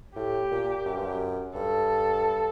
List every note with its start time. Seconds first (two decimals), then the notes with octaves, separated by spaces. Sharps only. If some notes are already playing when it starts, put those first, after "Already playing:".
0.16 A2 G4
0.51 A#2
0.86 F#2
0.96 G2
1.06 F#2
1.55 G2 A4